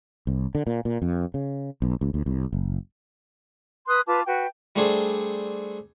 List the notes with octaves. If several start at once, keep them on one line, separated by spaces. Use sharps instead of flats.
C2
D3
A#2
A#2
F2
C#3
B1
C#2
D2
C2
F#1
B4 C6 D#6 F#6
F4 B4 A5 D6
F#4 B4 G5
G3 A3 C4 D4 G#4 C5